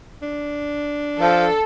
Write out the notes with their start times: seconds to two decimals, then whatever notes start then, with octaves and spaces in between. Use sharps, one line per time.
0.22 D4
1.19 F3 A4